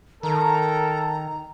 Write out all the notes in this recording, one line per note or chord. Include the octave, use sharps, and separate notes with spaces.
D#3 A4 A#4 A#5